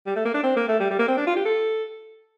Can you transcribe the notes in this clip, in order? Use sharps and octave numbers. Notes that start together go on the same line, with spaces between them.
G3
A3
A#3
D4
C4
A#3
A3
G3
G3
A#3
C4
D4
F4
G4
A4